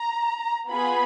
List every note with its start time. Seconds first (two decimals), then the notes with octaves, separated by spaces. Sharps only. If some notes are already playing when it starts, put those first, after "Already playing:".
Already playing: A#5
0.69 B3 F4 G#4 B5